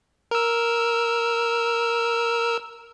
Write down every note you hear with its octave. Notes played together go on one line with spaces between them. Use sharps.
A#4 E6